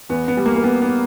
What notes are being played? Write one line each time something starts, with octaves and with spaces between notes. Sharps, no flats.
E2 B3
B3
G3
A#3
A#3
G3 B3
B3